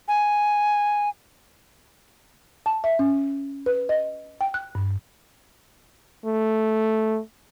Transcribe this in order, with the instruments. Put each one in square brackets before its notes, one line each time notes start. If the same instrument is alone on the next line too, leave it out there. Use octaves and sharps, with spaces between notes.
[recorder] G#5
[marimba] A5
E5
C#4
B4
D#5
G5
F#6
G2
[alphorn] A3